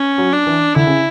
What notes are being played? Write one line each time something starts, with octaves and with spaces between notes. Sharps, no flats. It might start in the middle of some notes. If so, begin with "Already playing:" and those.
Already playing: C#4
F#3
D4
E3
D3 E4
C#3